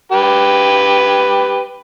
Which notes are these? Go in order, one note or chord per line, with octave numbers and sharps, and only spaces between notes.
G4 B4